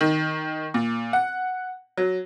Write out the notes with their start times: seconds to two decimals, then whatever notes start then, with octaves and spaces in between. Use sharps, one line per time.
0.01 D#3
0.74 A#2
1.13 F#5
1.97 F#3